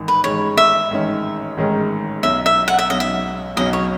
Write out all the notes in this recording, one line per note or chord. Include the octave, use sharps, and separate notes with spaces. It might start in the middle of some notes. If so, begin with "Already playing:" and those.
Already playing: A1 G#2 D#3
B4
A1 G#2 D#3 G#3 C#4 C#5
E5
A1 G#2 D#3 G#3 C#4
A1 G#2 D#3 G#3 C#4
B1 B2 F#3 C#4 E5
E5
F#5
E5
B1 B2 F#3 C#4 D#5
E5
B1 B2 F#3 C#4 D#5
C#5